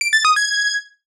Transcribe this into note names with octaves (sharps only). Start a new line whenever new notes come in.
D7
A6
D#6
G#6